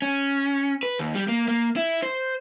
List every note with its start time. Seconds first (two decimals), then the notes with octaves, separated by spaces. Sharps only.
0.02 C#4
0.83 B4
0.99 D#2
1.15 G3
1.28 A#3
1.48 A#3
1.76 E4
2.03 C5